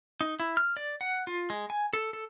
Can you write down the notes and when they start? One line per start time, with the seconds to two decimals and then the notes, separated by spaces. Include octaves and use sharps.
0.21 D#4
0.40 E4
0.57 F6
0.77 D5
1.01 F#5
1.27 F4
1.50 G#3
1.70 G#5
1.93 A4
2.13 A4